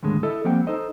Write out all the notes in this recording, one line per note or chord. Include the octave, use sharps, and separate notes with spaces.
D#2 A2 D3 G#3
E4 A4 D#5 E5
F3 G3 A#3 C4 F#5 G5
D#4 A4 C5 D#5